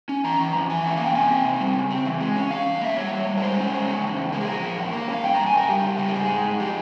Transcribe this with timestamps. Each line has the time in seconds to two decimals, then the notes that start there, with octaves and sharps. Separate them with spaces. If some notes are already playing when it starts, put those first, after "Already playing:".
0.09 C#4
0.24 E3 A#5
0.39 E3
0.55 F2
0.69 E3 G#5
0.84 C#4 E5
0.96 A#3 F5
1.06 G5
1.15 C3 G#5
1.30 C4
1.45 C3
1.60 G3
1.75 C#3
1.90 C4
2.06 E3
2.21 G#3
2.36 C#4
2.51 G2 F5
2.66 G2
2.81 A#3 E5
2.96 G3 C#5
3.11 G3
3.27 G3
3.38 A#4
3.42 G#3 C5
3.57 C#4
3.72 G#3
3.87 C#3
4.03 E2
4.17 E2
4.32 G#3 A#4
4.40 G#4
4.47 F3 A#4
4.63 F3
4.77 E2
4.93 A#3
5.08 C#4
5.14 F5
5.23 G2 G5
5.35 G2 A#5
5.46 G#5
5.53 G2 A#4
5.69 G3 G4
5.84 C#3
5.99 G3
6.08 A#4
6.14 G#2 G#4
6.29 G#2
6.44 G#2
6.59 F3 G4